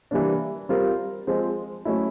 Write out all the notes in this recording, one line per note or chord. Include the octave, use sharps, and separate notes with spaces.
E3 G3 A#3 D4
G3 C4 F4 A#4
F3 G#3 C4
F#3 A3 C#4 E4